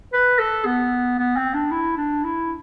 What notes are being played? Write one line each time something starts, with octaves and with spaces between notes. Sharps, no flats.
B4
A4
B3
B3
C4
D4
E4
D4
E4